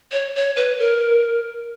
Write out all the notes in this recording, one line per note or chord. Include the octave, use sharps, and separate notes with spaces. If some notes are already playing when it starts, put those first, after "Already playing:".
C#5
C#5
B4
A#4